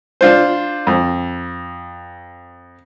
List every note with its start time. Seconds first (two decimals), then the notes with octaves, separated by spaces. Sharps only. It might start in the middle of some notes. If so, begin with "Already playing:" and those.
0.21 D4 F4 C5
0.87 F2